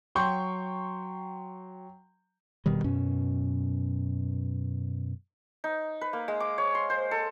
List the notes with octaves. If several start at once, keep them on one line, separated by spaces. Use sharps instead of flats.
F#3 G5 C6 C#6 G6
F1 B2 D#3 G3
F#2 B2 C#4
D#4
B4
A#3
G#3
D6
C#5
C6
C5
A4